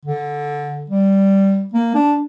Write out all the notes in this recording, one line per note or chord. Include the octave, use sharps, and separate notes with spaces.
D3
G3
A#3
D4